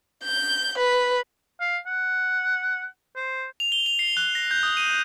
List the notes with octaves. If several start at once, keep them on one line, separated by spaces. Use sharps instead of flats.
G6
B4
F5
F#5
C5
F7
G7
F7
C7
F#6
A#6
G6
D#6
D#7